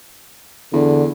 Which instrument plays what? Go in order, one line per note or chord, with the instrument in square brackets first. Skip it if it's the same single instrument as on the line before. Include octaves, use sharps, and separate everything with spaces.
[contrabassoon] E2 [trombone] D3